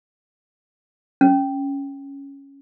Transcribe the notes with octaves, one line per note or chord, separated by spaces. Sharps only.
C#4